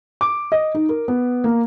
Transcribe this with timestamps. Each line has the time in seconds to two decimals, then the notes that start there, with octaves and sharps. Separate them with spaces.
0.21 D6
0.52 D#5
0.75 D#4
0.89 A#4
1.08 B3
1.44 A#3